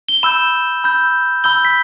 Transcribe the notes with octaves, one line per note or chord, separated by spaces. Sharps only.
G7
B5 E6 G6 E7
B5 E6 G6
B5 E6 G6 G7
B6